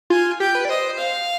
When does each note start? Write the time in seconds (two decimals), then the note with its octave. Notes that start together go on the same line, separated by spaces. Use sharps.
0.10 F4 G#5
0.40 G4 G5
0.55 B4
0.65 D5
0.69 C5 D#5
0.98 F5